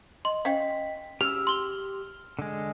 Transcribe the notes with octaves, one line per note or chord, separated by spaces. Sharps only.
D#5 C6
C#4 C5 D#5 F5 G5 B6
C#3 F#3 G4 E6 F6 F7
C6 G7
D3 G#3